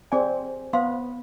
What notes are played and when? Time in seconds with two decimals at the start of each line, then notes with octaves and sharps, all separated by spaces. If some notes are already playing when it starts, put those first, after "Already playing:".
0.12 C4 G#4 D5 G#5
0.73 B3 C5 F5 C6